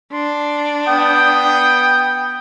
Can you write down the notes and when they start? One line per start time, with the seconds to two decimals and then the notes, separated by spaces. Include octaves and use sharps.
0.13 D4 C6
0.88 B3 G5 D#6